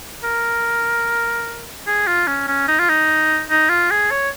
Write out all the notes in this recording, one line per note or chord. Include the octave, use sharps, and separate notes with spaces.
A#4
G#4
F4
C#4
C#4
D#4
F4
D#4
D#4
F4
G#4
C#5